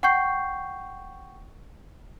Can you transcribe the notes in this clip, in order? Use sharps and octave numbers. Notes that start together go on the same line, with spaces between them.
F#5 G5 C#6 G6 C7